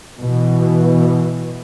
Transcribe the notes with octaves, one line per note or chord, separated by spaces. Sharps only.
B2 E3